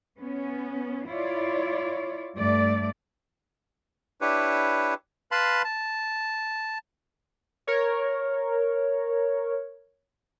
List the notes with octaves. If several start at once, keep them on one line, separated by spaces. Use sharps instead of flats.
B3 C#4
E4 F4 C#5 D5
G2 A3 D5
D4 E4 G4 B4 C#5
B4 F5 A5 B5 C6
A5
A#4 C#5